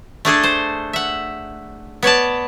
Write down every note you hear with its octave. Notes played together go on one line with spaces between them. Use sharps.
A3 D4 G#4 A4
C5
E5 F#5
B3 C#5 D5 A5